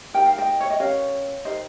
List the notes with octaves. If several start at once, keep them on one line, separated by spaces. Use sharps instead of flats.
D#4 G4 A#4 G5
F5
D#5 G5
C#5
D#5
C#4 G4 A#4 C#5 F5
D#4 G4 A#4 C5 D#5